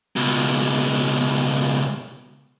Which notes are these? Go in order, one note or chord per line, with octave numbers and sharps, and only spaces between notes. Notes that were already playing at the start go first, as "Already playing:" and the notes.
C#2 B2